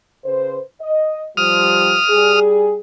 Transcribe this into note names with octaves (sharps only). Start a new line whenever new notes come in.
C#3 B4 C5
D#5
F3 G3 D#6 F6
G3 G#4